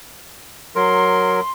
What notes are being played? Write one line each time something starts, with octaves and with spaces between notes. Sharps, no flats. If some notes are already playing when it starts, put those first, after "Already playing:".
F#3 A#4 C6